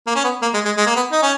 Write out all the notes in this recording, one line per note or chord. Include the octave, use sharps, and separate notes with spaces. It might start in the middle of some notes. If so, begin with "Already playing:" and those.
A#3
C#4
B3
A#3
G#3
G#3
G#3
A#3
B3
D#4
C#4